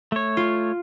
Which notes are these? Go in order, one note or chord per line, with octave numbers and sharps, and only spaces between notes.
A3 C#5
F4